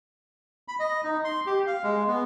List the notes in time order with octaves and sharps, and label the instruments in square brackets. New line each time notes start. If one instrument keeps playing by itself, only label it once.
[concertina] B5
D#5
D#4
C6
G4
F5
G#3
B3